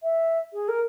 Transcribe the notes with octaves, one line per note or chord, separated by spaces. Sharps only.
E5
G#4
A#4